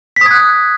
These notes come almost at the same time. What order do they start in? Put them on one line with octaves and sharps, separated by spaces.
B6 D#6 G#6 F#6